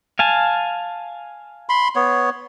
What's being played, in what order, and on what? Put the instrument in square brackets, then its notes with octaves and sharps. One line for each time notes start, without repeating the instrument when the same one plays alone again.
[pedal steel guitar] F5 G#5 A5
[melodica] B5 C6
B3 C#5